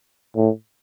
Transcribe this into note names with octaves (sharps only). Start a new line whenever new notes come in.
A2